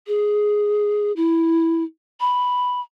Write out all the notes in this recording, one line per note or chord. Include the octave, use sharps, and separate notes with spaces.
G#4
E4
B5